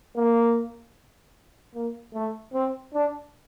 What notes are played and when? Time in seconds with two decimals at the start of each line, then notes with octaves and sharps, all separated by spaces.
0.17 A#3
1.75 A#3
2.14 A3
2.54 C4
2.94 D4